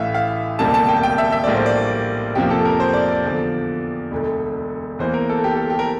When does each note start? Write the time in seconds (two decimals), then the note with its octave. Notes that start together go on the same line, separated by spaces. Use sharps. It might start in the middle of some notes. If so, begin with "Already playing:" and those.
Already playing: A1 A2 E3 E5 F5
0.14 F5
0.59 E1 D2 C3 G3 A#3 A5
0.74 A5
0.89 G5
1.03 G5
1.18 E5
1.32 E5
1.44 A#1 A2 G3 A#3 D5
1.55 C5
1.66 D5
2.35 F2 C3 F3 A#3 G4
2.50 A4
2.65 A#4
2.80 C5
2.93 D5
3.08 D5
3.24 E2 D3 F3
4.11 E1 D2 D3
4.99 E2 E3 A#3 C5
5.14 A#4
5.30 A4
5.44 G4
5.56 A4
5.70 G4
5.79 A#4